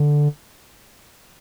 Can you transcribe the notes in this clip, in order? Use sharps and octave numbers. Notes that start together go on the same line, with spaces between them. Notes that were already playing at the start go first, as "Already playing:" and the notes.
Already playing: D3